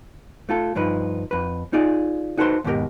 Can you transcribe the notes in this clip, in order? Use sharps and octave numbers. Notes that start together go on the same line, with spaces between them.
A3 F4 A4
G2 F3 D#4 B4
F2 B4
D#4 F4 G#4 D5
D#4 F#4 A4 B4 C5 C6
D#2 G#2 B2 G4 A#4 D#5